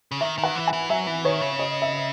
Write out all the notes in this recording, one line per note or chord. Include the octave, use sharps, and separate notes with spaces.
C#3
D#3 E5
D#3
F#5
E3
G#5
E3
F#3 E5
E3
D#3 C#5
C#3
D#5
E5